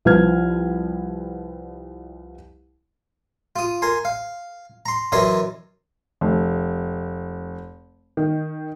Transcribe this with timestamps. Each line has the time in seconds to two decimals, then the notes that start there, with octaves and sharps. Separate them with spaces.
0.05 C2 F3 B4 F6 G#6
3.56 F4 D#6
3.82 A#4 G#5 C6
4.05 F5
4.86 A#5 C6
5.12 F#2 E3 A#4 C#5 D#5 C6
6.21 F1
8.17 D#3